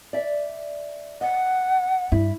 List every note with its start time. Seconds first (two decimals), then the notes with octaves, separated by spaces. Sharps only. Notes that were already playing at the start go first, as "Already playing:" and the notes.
0.13 D5 E5
1.21 D#5 F#5
2.12 G2 E4